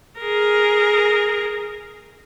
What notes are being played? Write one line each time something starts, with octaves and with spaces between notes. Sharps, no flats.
G#4 A#4